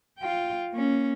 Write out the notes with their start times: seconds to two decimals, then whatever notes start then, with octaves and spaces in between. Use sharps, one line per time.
0.19 F4 G5
0.72 A#3 C#4